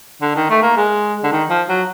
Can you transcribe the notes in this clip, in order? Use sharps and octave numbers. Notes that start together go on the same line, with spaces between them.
D3
D#3
A3
A#3
G#3
D3
D#3
F3
F#3